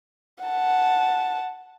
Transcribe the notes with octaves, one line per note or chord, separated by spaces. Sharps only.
F#5 A5